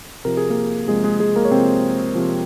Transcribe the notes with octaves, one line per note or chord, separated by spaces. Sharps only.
C3 F3 A#4
G#4
A#3 A#4
C3 F3 G#3 G#4
G#3 G#4
G#3 G#4
A#3 A#4
C#5
C3 F3 C4 C5
C3 F3